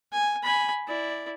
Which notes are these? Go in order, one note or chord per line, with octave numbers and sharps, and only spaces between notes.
G#5
G#5 B5
E4 D5